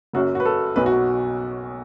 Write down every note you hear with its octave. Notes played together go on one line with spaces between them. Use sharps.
F#1 F#2 F#3 F#4
F#4
B4
A4
B1 B2 F#3 B4
F#4